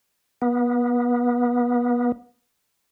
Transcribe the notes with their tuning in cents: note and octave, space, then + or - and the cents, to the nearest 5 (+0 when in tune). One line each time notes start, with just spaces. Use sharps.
B3 -30